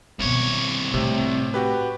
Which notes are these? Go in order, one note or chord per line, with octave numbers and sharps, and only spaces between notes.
C2 B2 D#3 C#5
A2 C3
F#4 G4 B4